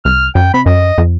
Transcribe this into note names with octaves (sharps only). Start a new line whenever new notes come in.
C2 F6
F#2 G5
C3 B5
F#2 D#5
F2